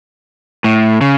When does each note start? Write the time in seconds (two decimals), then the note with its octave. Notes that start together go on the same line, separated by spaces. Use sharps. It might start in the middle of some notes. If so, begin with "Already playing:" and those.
0.64 A2
1.01 C#3